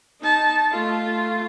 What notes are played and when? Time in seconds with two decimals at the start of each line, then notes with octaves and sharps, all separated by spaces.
0.21 D#4 A5
0.72 A3 F4